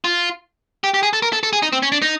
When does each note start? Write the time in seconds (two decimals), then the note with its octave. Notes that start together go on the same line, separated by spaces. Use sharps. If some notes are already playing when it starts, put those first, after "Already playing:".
0.04 F4
0.84 G4
0.94 G4
1.03 G#4
1.13 A4
1.22 A#4
1.33 A4
1.43 A4
1.53 G#4
1.62 D#4
1.72 C4
1.82 C#4
1.92 D4
2.02 D#4